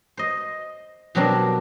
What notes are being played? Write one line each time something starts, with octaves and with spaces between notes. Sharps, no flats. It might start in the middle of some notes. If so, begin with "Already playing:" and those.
C5 D#5
B2 F#3 G3 C4 D4 A#4